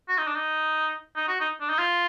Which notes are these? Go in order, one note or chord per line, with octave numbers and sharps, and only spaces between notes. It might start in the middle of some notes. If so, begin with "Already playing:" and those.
F#4
D#4
D4
D#4
D#4
F#4
D#4
D4
D#4
F4